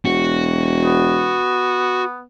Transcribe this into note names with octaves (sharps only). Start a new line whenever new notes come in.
E1 F#4
B3